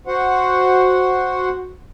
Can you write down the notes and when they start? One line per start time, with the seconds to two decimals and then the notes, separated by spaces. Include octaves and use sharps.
0.07 F#4 C5 F#5